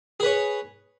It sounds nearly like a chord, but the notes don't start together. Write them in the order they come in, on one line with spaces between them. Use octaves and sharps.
G#4 B4 C#5